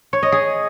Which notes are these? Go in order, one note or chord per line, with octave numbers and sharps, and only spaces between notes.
C#5
D#5
G#4